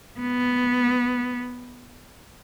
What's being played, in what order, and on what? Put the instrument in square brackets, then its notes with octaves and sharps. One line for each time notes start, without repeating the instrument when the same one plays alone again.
[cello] B3